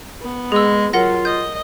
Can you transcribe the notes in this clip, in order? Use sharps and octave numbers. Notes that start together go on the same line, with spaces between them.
B3
G#3 G#4 E6
F#3 F4 A#4 F#5 A#6
D#5 G6